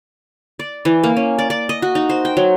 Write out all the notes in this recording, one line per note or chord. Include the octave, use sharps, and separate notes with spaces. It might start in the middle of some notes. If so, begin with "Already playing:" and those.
D5
E3
A#3
C#4
D5
D5
D#5
F#4
D#4
C5
G5
F#3